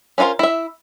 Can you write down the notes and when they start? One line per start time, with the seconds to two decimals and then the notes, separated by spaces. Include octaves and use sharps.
0.18 C#4 D4 F4 A#4 C5
0.39 E4 E5